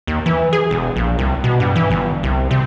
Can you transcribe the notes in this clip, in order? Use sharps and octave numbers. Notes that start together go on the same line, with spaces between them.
D#2
E3
G#4
E1
A#1
C2
B2
G2
E3
G1
C2
C3